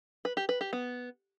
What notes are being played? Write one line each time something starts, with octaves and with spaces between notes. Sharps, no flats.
B4
G4
B4
G4
B3